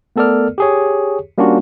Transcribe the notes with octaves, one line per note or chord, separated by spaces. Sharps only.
A3 B3 A4 A#4 D5 F6
G4 G#4 C#5
G3 A#3 C#4 D4 F4 F#4